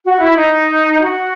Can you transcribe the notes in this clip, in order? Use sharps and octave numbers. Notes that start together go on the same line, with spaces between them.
F#4
E4
D#4
F#4